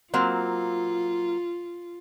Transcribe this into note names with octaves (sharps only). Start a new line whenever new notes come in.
F#3 A#3 C4 F4